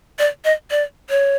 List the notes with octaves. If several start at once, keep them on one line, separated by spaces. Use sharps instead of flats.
D5
D#5
D5
C#5